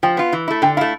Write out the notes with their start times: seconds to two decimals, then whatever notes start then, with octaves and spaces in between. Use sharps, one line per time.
0.03 F3 G5
0.17 B3 F4
0.33 E3
0.48 A3 E4
0.62 D3 G5
0.77 A3 E4 F5